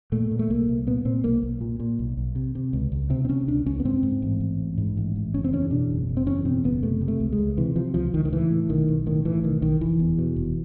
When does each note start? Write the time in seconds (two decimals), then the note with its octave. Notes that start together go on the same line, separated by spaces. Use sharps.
0.12 A#2 A3
0.31 A#2
0.39 A3
0.50 C2 A#3
0.68 C2
0.87 A#2 B3
1.05 A#2 C4
1.24 B1 A#3
1.43 B1
1.61 A#2
1.80 A#2
1.99 B1
2.17 B1
2.35 C3
2.55 C3
2.73 C#2
2.92 C#2
3.10 C3 C4
3.25 C4
3.29 C3 C#4
3.47 C#2 D4
3.66 C#2 C#4
3.80 B3
3.85 G#2 C4
4.03 G#2
4.22 A1
4.40 A1
4.60 G#2
4.78 G#2
4.97 A1
5.16 A1
5.34 F#1 C#4
5.44 C4
5.53 E2 C#4
5.71 B2 D4
5.90 F#1
6.09 F#1
6.17 C4
6.27 E2 C#4
6.45 B2 C4
6.64 F#1 B3
6.83 C3 A3
7.01 C3
7.08 A3
7.20 C#2
7.32 G#3
7.38 C#2
7.57 C3 E3
7.76 C3 F3
7.94 C#2 F3
8.14 C#2 D#3
8.25 D#3
8.33 A2 E3
8.50 A2
8.69 B1 D#3
8.88 B1
9.06 A2 D#3
9.25 A2 E3
9.43 B1 D#3
9.62 B1 D#3
9.81 F1 E3
9.99 E2
10.18 B2
10.36 F1